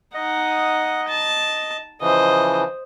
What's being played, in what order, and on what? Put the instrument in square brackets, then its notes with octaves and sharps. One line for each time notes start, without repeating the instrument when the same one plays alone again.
[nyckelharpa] D#4 F#5 [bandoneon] D#5
[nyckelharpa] A5
[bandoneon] C#3 E3 F3 [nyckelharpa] C5 D#5